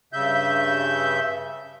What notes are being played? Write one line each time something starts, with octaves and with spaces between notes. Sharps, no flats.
G2 C#3 E5 G6